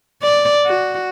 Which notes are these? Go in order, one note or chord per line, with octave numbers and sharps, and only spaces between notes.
D5
F#4